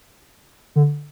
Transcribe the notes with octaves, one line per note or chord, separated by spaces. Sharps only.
D3